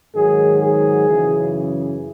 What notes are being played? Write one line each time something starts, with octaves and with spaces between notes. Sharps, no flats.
G#2 D#3 F#3 G#4
G#4
F#2 C#3 E3